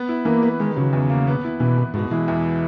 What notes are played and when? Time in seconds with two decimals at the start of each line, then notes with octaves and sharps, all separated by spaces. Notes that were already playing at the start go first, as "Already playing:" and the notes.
Already playing: B3
0.09 E4
0.25 E3 A#3
0.42 B4
0.59 D#3 G#3
0.76 C#3 F#3
0.93 E2
1.10 A#3
1.27 B3
1.44 E4
1.60 B2 E3
1.78 E3
1.94 G#2 B2
2.11 E3 G#3
2.28 E2